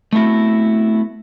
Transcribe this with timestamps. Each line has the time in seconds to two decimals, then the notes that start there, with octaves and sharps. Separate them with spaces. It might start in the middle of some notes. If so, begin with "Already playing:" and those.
0.13 A3 B3 C4 E4 F#4